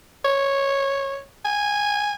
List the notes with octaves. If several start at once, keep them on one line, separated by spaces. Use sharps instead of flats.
C#5
G#5